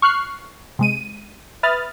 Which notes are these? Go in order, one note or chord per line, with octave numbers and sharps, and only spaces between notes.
C#6 F6 F#6 C7
C3 G#3 D#7
B4 E5 B5 D#6 F6 A6